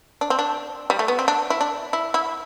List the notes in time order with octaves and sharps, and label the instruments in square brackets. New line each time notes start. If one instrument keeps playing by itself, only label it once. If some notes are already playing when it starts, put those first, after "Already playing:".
[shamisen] D4
C4
D4
G3
A3
B3
C4
D4
E4
D4
E4
E4